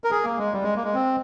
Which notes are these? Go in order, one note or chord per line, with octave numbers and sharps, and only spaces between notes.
A#4
G#4
A#3
G#3
G3
G#3
A#3
G#3
C4